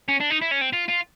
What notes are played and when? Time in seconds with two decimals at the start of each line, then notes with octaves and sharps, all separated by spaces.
0.09 C#4
0.20 D4
0.30 D#4
0.42 E4
0.51 C#4
0.61 C4
0.73 F4
0.89 F4